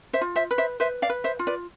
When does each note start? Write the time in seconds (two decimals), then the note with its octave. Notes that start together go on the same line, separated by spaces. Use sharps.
0.13 C5 E5
0.21 F4
0.36 C5 E5
0.51 B4
0.58 C5 E5
0.80 B4 C5 E5
1.02 D5 F5
1.10 B4
1.24 C5 E5
1.39 F4
1.47 B4 D5